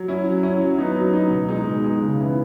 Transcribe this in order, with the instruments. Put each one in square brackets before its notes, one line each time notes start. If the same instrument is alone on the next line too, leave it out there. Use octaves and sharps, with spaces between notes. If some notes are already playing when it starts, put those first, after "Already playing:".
Already playing: [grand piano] F#3
C#4 E4
F#3
C#4 E4
F#3
B3 D#4
F#3
B3 D#4
B2
G#3 D#4
B2
G#3 D#4
C#3
E3 B3 E4